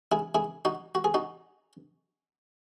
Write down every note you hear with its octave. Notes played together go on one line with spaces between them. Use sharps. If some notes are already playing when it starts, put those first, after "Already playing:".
E4 G#4
E4 G#4
D#4 F#4
F#4
G#4
D#4 F#4